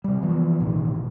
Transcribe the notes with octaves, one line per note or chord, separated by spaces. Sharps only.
C3 G3
E3 F3 B3
A1 B2 D#3
B2